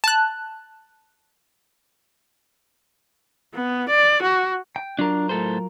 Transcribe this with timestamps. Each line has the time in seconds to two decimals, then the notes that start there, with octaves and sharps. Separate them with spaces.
0.04 A5 F#6
3.54 B3
3.89 D5
4.22 F#4
4.76 G5
4.99 F#3 D4 F4 A#4
5.29 A2 A4 C5